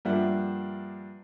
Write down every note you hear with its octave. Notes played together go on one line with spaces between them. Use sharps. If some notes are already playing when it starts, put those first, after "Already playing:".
G2 F3 A#3 D4 E5 F#5